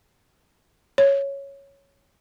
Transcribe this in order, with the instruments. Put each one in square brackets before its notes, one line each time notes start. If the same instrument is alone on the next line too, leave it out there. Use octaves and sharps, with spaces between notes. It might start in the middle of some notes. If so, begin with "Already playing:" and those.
[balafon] C#5